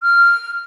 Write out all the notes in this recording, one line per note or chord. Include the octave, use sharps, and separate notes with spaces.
F6